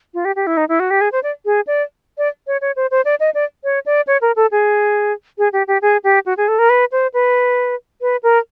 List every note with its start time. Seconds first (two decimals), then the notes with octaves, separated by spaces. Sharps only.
0.14 F4
0.25 G4
0.36 G4
0.47 E4
0.57 D#4
0.69 E4
0.80 F#4
0.91 G4
1.01 G#4
1.12 C5
1.23 D5
1.45 G#4
1.67 D5
2.18 D5
2.47 C#5
2.61 C#5
2.76 C5
2.91 C5
3.05 D5
3.20 D#5
3.34 D5
3.64 C#5
3.86 D5
4.07 C#5
4.22 A#4
4.36 A4
4.51 G#4
5.38 G#4
5.53 G4
5.68 G4
5.82 G#4
6.04 G4
6.26 F#4
6.37 G#4
6.48 A4
6.59 A#4
6.70 B4
6.92 C5
7.14 B4
8.01 B4
8.23 A#4